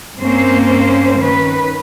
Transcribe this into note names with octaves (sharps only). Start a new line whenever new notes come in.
G2 A#3 C4 C#4 C5
D#3 C#4 B4